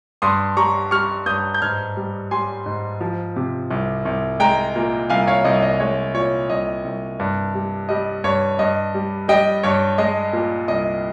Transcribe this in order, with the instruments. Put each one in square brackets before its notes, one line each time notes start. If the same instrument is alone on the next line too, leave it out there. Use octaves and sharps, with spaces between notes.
[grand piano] G2 C6 D#6
G3 A#5 C#6
G3 C#6 F6
G2 D#6 G6
G6
G#2 F6 G#6
G3
G3 G#5 C6
G#2
F3
C3
C2
C2
G#3 G5 A#5
A#2
C2 F5 G#5
C#5 F5
C2 D#5
D#5
G#3 C#5
A#2 C#5
C2 D#5
C2
G2
G3
G3 D#5
G2 C#5
G2 D#5
G3
G3 D#5 G5
G2 C#5
G#3 D#5
A#2
C2 D#5